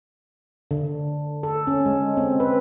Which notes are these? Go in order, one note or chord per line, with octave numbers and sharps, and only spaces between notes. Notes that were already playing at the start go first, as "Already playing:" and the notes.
D3
A4
C#4
G#3
C4
B4